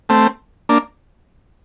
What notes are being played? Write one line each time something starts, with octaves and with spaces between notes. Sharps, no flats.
A3 C4
A#3 D4